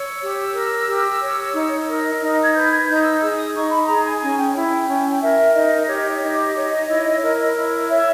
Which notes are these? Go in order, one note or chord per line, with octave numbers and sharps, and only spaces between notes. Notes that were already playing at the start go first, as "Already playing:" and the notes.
Already playing: C#5 E6
G4
A#4
G4
C#5
D#4
A#4
D#4
G#6
B4 G6
G#6
D#4 G6
E6
G#4 E6
D#6
D#4 C#6
B5
B5
G#4 A#5
G#5
C#4 G#5
G5
E4 G5
C#4
G5
A#4 E5
D#4 D#5
G4 C#5
D#4 D#5
C#5
E4
A#4
E4
C#5 E5